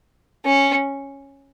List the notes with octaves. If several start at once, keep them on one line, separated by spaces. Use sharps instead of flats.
C#4